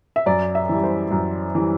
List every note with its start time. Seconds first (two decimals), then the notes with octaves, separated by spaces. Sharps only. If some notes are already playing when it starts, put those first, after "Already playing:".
0.16 E5
0.26 F#2 D5
0.55 E5
0.69 E3 G3
0.84 C5
1.11 F#2
1.55 E3 G3